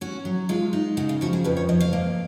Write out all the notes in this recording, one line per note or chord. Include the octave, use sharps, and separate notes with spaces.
C#4 F#4
F#3
G#3 F4
D#4
C#3 F#4
F4
F3 F#4
G#4
F2 B4
C#5
F2 D#5
F5
A#3